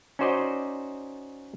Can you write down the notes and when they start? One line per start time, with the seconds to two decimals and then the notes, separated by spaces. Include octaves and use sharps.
0.19 C#4 D#4 F#4 C5 D5 D#5